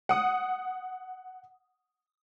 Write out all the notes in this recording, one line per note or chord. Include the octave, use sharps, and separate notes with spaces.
F#5 D#6